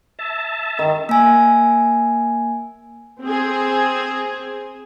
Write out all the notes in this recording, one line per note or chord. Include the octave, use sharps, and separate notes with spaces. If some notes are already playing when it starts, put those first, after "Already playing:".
E5 A5
D#3
A#3 G#5
C4 G#4